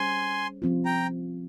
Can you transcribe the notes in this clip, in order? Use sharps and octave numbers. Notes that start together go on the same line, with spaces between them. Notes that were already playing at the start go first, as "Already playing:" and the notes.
Already playing: G3 C#4 G#4 C5 G#5 C6
F3 C4 F4
G5 A#5